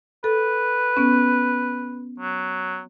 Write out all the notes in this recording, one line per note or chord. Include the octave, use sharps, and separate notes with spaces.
A4 B4
B3 C#4
F#3